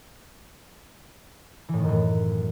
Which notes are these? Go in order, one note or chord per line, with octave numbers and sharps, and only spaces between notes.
E3
A2
D#3
F#2
A2